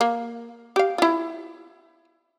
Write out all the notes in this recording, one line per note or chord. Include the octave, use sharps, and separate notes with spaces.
A#3
G4 F5
E4 F4